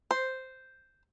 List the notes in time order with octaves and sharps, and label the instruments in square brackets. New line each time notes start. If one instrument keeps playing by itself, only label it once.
[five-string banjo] C5